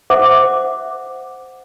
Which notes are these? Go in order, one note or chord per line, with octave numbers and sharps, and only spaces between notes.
C5 E5 F#5 D6